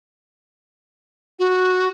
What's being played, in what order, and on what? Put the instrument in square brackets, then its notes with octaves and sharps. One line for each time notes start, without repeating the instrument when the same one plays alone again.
[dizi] F#4